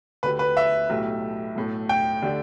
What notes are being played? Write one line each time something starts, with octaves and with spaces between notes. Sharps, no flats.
D2 D3 A3 G4 B4
B4
E5
B1 A2 A3 G4
B1 A2 A3
G5
D3 A3 G4 D5